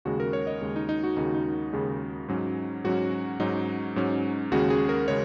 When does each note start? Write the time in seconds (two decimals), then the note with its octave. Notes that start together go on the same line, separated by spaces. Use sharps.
0.05 D#2 C#3 G#3 F#4
0.20 A#4
0.33 C#5
0.47 D#5
0.62 D#2 C#3 G#3
0.76 D#4
0.89 D#4
1.04 F#4
1.17 D#2 C#3 G#3 D#4
1.26 F#4
1.34 D#4
1.73 D#2 C#3 G#3
2.28 G#2 F#3 C#4
2.84 G#2 F#3 C#4 F#4
3.40 G#2 F#3 C#4 D#4
3.96 G#2 F#3 C#4
4.51 D#2 C#3 G#3 C#4 F#4
4.70 G#4
4.89 A#4
5.08 C#3 G#3 C#5